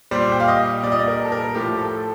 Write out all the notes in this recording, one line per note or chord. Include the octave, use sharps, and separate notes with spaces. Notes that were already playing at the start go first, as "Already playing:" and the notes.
A#2 G3 C5
G5
F5
D#5
A#2 G3 D5 D#5
D5
A#4
A4
A#4
A2 F3 A3 G4
G4
A4